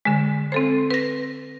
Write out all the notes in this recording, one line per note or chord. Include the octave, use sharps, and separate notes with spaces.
D3 G#3
C4 A4 C5
B4 A#6